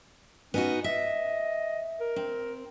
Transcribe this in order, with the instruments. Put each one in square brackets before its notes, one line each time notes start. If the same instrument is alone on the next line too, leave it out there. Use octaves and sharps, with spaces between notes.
[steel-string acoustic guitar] B3 D#4 F#4 [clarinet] C#4
[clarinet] D#5 [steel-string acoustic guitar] E5
[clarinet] A#4
[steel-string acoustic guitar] C4